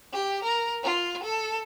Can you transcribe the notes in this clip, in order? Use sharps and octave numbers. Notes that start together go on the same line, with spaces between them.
G4
A#4
F4
A4